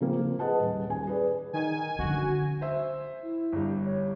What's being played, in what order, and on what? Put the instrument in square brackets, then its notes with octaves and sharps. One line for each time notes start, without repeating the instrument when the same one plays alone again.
[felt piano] C#3 F3 A#3 C4
F3
G#4 B4 D#5 F#5 A5
D#1
D#1 G#5
G#4 B4 D5
[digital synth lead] D#3 [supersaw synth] G#5
[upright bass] D3 C#4 [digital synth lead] F#4
[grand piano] C5 E5
[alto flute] E4
[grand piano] G1 G3
[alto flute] C#5